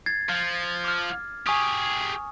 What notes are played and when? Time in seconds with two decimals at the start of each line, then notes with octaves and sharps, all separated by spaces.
0.06 G#6 A6 C7
0.29 F3
0.84 D6 F6
1.47 G4 G#4 G#5 C#6 D#6